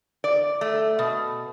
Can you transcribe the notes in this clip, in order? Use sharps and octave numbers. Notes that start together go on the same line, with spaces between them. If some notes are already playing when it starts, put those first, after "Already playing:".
D5
A3
B2